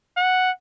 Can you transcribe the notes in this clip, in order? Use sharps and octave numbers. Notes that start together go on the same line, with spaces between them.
F#5